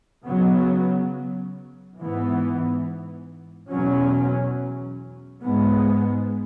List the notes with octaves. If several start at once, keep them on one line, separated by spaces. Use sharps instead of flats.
C#3 F#3 B3
G#2 E3 B3
E2 B2 F#3 C#4
G#2 G#3 B3